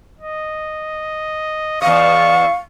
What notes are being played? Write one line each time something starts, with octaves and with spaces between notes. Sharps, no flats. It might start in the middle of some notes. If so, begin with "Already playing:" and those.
D#5
E2 D#5 F5 C#6